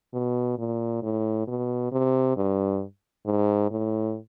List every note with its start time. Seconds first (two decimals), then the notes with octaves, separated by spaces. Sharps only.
0.14 B2
0.58 A#2
1.03 A2
1.47 B2
1.92 C3
2.37 G2
3.26 G#2
3.71 A2